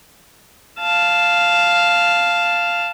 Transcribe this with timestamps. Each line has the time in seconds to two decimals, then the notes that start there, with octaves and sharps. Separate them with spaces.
0.80 F5 A5